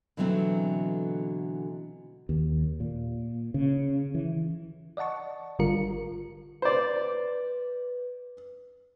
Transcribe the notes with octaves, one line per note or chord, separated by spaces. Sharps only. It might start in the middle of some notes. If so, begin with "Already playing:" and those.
B2 D3 E3 F#3 A3 C4
D#2
A#2
C#3
E3
D5 D#5 F#5 A5 C#6
G#1 D3 G3 F4 A#4 C#7
B4 C5 D5